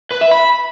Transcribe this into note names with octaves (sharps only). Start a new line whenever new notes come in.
B4
E5
B5